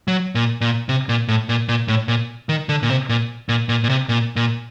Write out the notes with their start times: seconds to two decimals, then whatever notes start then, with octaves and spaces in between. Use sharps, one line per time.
0.08 F#3
0.35 A#2
0.61 A#2
0.89 C3
1.09 A#2
1.28 A2
1.49 A#2
1.69 A#2
1.88 A2
2.08 A#2
2.49 D#3
2.69 D3
2.83 A#2
2.90 C3
3.09 A#2
3.49 A#2
3.69 A#2
3.84 A#2
3.89 C3
4.09 A#2
4.36 A#2